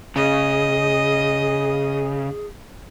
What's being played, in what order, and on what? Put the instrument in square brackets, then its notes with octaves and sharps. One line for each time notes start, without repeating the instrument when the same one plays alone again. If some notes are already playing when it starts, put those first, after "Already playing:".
[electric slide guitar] C#3 [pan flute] G#4 [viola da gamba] D#5